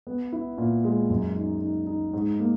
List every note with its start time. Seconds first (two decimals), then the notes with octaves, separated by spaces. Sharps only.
0.07 B3
0.33 E4
0.58 A#2
0.84 G#3
1.10 F#2
1.36 D#4
1.61 D#4
1.87 D#4
2.13 G#2
2.40 A#3